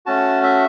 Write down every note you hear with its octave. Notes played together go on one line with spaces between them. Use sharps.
A3 C#4 F#4 A5
E5